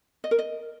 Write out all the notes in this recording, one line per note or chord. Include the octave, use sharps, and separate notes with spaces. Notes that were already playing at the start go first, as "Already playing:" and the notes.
D#5
A#4
D#5